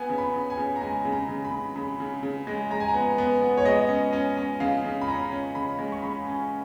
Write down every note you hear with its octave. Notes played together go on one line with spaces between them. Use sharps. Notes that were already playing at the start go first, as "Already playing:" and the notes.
Already playing: B3 G#5
C#3
B5
C#3
G#5
C#3
A#5
G#3 G#5
C#3
A#5
C#3
B5
C#3
C#3 B5
C#3
C#3
G#3
G#3 A#5
G#5
A#5
B3
B3
B3
C#5
G#3 D#5
C#4
C#4
C#4
C#3 F5
C#3
B5
C#4 A#5
C#4
C#3 B5
G#3
C#6
C#3 B5
C#4